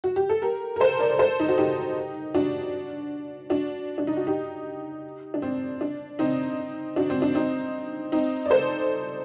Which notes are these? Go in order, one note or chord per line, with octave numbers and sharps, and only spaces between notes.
F#4
G4
A4
G4 A#4
A#4
A4 C5
A#4 D5
D5
A4 C5
D#4
F#4
D#4 G4
D4 F#4
D4 F#4
D4
D#4
F#4
D#4 G4
D4
C4
D4
C4 D#4
D4 F#4
C4
D4
C4 D#4
C4 D#4
D5
A4 C5